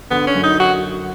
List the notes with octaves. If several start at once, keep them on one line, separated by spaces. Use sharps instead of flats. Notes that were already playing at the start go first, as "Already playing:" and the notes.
D3 B3
C#4
F#2
D#4
F#4